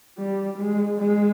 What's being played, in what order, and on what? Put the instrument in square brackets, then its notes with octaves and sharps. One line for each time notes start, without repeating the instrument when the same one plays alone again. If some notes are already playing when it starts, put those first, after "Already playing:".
[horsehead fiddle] G3
G#3
G#3